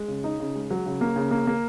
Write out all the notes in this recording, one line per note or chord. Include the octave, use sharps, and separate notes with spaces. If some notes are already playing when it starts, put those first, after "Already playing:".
Already playing: G#3
C#3
D#4
C#3
G#3
F#3
C#3
A#3
C#3
A#3
A#3